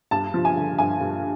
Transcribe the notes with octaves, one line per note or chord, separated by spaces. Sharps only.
G2 A5
F3
G#5
D3
G2 G#5
G2